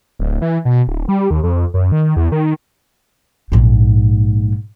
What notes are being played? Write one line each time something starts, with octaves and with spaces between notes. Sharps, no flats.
D1
E3
B2
D1
G3
D#2
F2
F#2
D#3
E2
D#3
A#1 G#2